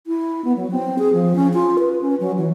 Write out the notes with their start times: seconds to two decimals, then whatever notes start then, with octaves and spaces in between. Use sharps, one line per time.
0.07 E4
0.45 B3
0.56 F#3
0.71 C4
0.99 G#4
1.13 F3
1.35 C#4
1.54 F4
1.79 B4
2.01 C#4
2.20 F#3
2.38 E3